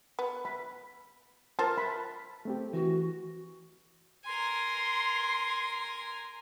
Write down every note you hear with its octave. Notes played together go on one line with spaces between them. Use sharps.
B3
B5
F4 A#4 C5 A5
B5
A3 C4 G4
E3 F#4
A#4 G#5 C6